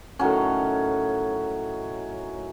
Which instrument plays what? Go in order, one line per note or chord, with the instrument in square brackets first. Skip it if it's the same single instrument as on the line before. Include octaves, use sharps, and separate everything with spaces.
[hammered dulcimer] A2 D#3 F#3 C#4